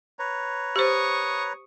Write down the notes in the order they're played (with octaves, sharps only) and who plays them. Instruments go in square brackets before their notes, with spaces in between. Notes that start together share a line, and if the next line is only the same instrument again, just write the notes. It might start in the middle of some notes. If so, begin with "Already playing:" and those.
[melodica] B4 C#5 A#5
[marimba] G4 C5 [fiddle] C#6 D#6